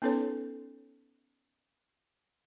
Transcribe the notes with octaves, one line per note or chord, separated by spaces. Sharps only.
B3 C#4 D#4 A4 B4 C#5